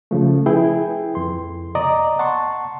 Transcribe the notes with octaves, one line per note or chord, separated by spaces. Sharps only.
C#3 F3 A3
E4 G#4 B4 G5
F2 C6
D5 D#5 A#5 D6 D#6
F#5 A5 C6 C#6